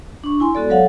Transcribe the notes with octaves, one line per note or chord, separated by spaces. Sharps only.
D4 C#6
E4 G#5 C6
G#3 B3 F#4 A4 D5
F#3 A4 C#5 F5 F#5